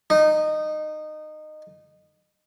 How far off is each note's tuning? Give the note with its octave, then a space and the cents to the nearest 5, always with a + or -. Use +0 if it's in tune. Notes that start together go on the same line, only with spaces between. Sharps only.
D#4 -20